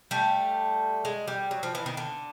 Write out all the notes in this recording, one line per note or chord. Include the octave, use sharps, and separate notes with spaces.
G3 A3
G#3
G3
F#3
F3
E3
D#3
D3